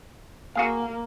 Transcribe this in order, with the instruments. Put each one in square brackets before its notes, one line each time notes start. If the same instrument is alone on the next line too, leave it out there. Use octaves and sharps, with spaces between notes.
[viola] A#3 [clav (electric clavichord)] F#4 G#4 F5